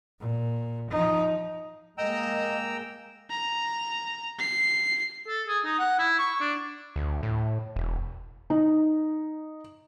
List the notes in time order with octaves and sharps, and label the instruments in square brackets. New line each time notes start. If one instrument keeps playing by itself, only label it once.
[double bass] A#2
F3 D#4
[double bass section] G#3 A#3 [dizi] D#5 [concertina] G5 A#5 E6
[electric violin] A#5
C7
[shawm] A4
G#4
D#4
F#5
E4
C#6
D4
[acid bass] D2
A2
E1
[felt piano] D#4